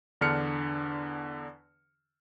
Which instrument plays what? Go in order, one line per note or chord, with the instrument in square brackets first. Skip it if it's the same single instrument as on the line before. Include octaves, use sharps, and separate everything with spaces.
[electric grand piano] E2 D3 D4 F6 C#7